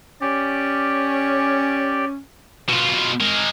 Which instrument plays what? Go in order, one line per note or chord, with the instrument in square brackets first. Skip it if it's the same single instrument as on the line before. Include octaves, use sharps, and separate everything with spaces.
[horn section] C#4 [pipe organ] G4 D5
[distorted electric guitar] B2 F4
G#3 A#4